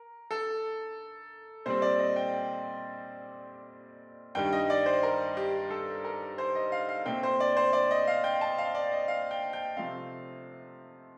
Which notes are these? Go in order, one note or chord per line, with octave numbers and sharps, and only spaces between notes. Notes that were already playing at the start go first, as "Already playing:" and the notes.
Already playing: A#4
A4
A#2 G3 C4 C5
D5
D#5
G5
G5
G2 D#3 G3 G5
D#5
D5
C5
A#4
G4
A4
A#4
C5
D#5
F5
F5
A#2 A3 C4 G5
C5
D5
C5
D5
D#5
F5
G5
A5
F5
D5
D#5
F5
G5
G5
C3 F3 A3 C4 F5